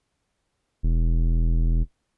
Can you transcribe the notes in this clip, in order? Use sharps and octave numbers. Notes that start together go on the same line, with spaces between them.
E1